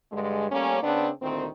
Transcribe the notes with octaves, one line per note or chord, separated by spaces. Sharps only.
G2 D3 G#3
G3 A3 A#3 C#4
C#3 B3 C4 D4
D2 A#2 D#3 C4